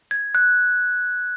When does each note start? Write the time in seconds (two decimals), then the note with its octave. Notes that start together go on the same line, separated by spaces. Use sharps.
0.11 G#6
0.35 F#6